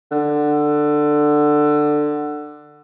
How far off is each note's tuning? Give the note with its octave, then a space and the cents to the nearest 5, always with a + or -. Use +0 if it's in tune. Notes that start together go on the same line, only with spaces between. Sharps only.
D3 +15